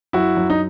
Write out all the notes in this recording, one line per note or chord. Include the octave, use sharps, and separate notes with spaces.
F#2 E4 F#4
F#2
D#4